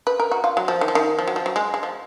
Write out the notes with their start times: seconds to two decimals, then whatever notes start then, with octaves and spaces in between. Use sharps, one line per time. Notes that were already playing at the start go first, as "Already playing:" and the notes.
0.07 B4
0.20 A#4
0.32 F#4
0.44 F4
0.57 F#3
0.68 F3
0.81 D#3
0.88 F3
0.95 D#3
1.19 F3
1.28 F#3
1.36 F3
1.46 F#3
1.56 G#3
1.74 G#3
1.83 F3